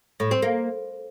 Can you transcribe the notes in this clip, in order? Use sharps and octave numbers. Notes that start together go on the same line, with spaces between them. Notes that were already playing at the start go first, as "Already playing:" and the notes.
A2
C4
A#3